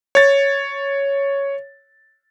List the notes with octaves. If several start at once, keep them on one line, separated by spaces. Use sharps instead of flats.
C#5 A6